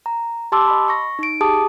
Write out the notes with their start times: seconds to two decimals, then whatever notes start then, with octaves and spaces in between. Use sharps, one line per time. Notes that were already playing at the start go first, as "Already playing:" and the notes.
0.06 A#5
0.52 G4 A5 C6 D6 E6
0.68 D#5 B5
0.88 C#6 A#6
1.19 D#4 D7
1.41 G4 G#4 A5 D6 D#6